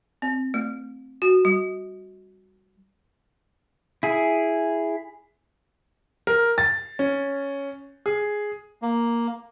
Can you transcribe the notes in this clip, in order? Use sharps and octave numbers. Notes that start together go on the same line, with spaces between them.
C4
A3
F#4
G3
E4 G#4
A#4
A6
C#4
G#4
A#3